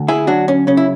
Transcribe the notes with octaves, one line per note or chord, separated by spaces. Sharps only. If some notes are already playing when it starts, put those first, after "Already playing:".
Already playing: D2
E4 G#4
F#3 D4 F#4
C#4
C#3 C#4
E4